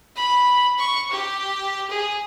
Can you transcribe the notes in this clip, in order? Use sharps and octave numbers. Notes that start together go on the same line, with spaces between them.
B5
C#6
G4
G#4